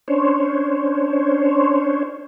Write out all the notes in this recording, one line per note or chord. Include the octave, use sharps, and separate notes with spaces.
C#4 D4 C5 C#5